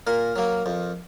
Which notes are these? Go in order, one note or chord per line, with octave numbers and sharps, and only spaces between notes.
A#2 A#4
F#3 A#3
F2